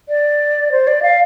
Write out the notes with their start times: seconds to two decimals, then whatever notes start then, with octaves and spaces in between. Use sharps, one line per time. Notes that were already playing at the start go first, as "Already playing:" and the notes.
0.09 D5
0.72 C5
0.87 D5
1.02 F5